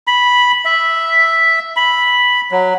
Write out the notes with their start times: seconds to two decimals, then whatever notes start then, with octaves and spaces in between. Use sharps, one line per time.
0.07 B5
0.65 E5
1.76 B5
2.51 F#3